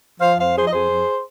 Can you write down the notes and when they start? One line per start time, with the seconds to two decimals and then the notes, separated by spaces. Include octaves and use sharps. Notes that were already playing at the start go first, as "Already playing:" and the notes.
0.20 F3 C5 F5
0.38 F2 C5 F5
0.55 F3 G#4 C5
0.66 D#5
0.72 F2 G#4 C5
0.90 F2